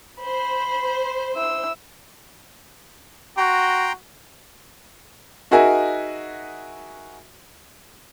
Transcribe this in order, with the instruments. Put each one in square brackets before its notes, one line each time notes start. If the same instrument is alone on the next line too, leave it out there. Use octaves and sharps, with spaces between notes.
[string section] C5 [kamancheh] B5
[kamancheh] E4 E6
[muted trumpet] F#4 [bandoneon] G5 A#5 C6
[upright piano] D#4 F#4 G#4 A#4 E5 G#5